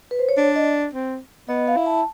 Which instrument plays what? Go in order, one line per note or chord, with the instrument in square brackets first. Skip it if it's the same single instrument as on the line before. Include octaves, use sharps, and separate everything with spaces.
[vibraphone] B4
C5
C#5
[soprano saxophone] D4 [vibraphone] D5
[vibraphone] D#5
[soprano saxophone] C4
[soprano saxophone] B3 [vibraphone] D#5
[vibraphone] F5
[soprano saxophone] E4
[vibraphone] A5